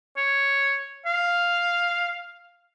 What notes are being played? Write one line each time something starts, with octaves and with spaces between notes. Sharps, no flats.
C#5
F5